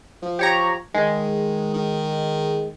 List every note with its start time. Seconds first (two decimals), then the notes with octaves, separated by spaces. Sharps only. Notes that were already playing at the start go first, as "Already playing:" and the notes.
0.22 F3
0.39 G4 C#5 A#5
0.94 D#3 G#3
1.74 D#3